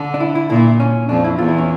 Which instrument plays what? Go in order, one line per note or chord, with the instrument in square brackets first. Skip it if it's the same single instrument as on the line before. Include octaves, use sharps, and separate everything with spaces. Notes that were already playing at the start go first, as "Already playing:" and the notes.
Already playing: [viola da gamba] D3
[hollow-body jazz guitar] D4
E4
E4
[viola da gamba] A#2 [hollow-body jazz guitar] E4
[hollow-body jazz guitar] C#4
[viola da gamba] F2 [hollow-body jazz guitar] D4
[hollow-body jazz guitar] E4
[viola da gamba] E2 [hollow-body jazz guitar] F4
[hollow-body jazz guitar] E4
C#4